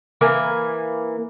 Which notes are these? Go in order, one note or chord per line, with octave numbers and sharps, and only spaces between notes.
E3 A#3 G#5